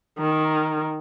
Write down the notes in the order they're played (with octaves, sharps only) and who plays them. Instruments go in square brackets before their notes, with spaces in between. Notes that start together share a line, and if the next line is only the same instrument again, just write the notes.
[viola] D#3